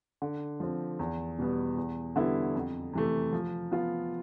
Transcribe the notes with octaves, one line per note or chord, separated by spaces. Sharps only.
D3
F3 C4
E2
B2 G3 B3
E2
D3 G3 B3 E4
F2
C3 E3 A3
F3
B3 F4